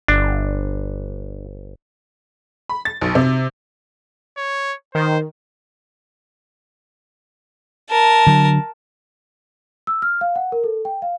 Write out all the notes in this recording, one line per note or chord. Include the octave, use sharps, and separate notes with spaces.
G1 D4
B5
A6
B1
C3
C#5
D#3 C5
A#4 A5
D3 F#3
E6
F6
F5
F#5
A#4
A4
G5
F5